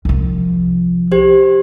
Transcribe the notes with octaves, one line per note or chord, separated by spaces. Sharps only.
C2 F3
G4 C5